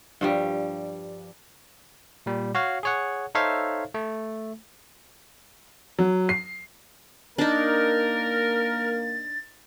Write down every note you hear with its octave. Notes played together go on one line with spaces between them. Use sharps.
G2 F3 G3
A#2 G3
F#4 C#5 F5
G#4 C#5 F#5
D#4 A4 C5 C#5 E5 F5
A3
F#3
C7
A#3 D4 D#4 A#4 A6